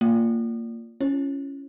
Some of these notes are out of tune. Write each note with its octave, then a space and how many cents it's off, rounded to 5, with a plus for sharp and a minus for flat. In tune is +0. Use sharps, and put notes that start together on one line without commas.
A#3 -20 F4 +0 D5 -10
C#4 +0 E4 +45 C#5 -25